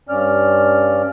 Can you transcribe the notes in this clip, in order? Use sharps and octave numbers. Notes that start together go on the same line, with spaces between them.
G2 C#4 D5 F6